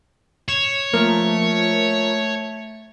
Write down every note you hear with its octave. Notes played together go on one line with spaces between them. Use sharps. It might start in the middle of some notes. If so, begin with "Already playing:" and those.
C#5 E7
F3 A3 A#3 A#4